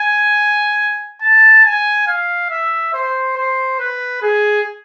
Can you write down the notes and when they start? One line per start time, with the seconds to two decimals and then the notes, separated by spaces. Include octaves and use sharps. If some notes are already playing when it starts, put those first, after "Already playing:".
Already playing: G#5
1.22 A5
1.65 G#5
2.08 F5
2.50 E5
2.93 C5
3.37 C5
3.80 B4
4.22 G#4